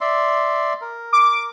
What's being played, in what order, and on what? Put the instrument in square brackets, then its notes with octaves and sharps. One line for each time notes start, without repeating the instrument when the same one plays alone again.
[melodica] D5 E5 C6
A#4
[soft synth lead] D6